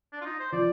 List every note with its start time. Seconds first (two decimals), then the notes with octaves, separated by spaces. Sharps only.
0.12 D4
0.21 F4
0.25 D#4
0.39 C5
0.52 F3 D5